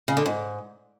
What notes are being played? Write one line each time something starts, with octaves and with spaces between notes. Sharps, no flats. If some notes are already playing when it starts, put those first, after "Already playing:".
C#3
D3
G#2